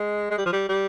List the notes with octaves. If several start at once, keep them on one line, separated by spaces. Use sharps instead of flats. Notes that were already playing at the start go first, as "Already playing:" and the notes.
Already playing: G#3
G#3
G3
F3
G3
G3